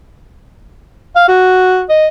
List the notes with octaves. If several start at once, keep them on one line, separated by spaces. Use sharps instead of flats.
F5
F#4
D#5